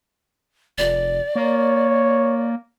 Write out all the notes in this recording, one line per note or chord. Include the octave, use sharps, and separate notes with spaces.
F1 D5
A#3 C#5